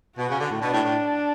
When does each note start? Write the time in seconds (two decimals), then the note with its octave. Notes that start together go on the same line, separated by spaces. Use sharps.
0.17 B2 F#4
0.28 C#3
0.40 D3
0.51 A2
0.61 B2 D4
0.73 A2
0.84 A2